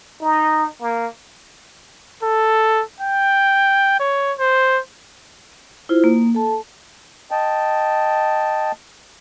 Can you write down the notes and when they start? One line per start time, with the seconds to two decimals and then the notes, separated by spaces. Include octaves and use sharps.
0.21 D#4
0.81 A#3
2.23 A4
3.00 G5
3.99 C#5
4.39 C5
5.89 E4 F4 C5
6.04 A#3
6.35 A4 A5
7.31 D#5 G5 A5